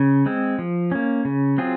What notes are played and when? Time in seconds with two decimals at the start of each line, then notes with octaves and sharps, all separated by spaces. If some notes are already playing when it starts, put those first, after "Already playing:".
Already playing: C#3
0.26 G#3 C4
0.59 F3
0.92 A#3 C#4
1.25 C#3
1.58 F#3 C4 F4 G#4